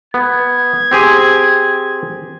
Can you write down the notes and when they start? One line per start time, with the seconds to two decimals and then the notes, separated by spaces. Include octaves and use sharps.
0.14 B3 G#6
0.91 C4 G4 G#4